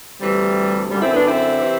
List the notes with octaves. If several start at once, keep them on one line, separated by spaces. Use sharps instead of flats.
D2 C3 E3 G3
F#2 D3 G3
C4 E4
B3 D4
C4 E4
C3 E3